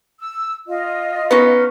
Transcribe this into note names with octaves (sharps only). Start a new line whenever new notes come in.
E6
F4 D#5
B3 C#4 D#4